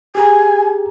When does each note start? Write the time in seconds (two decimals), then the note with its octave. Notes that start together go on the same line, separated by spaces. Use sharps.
0.15 G4 G#4 G#5 A#5